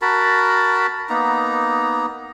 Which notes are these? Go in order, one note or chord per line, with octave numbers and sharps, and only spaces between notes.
F#4 A#4 A5 B5
A#3 B3 D#4 A#5